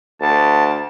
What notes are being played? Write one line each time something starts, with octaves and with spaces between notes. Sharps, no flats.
D2 A5